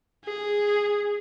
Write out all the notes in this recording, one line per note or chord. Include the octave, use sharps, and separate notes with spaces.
G#4